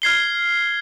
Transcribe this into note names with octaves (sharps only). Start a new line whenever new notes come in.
F6 G#6 C7 G7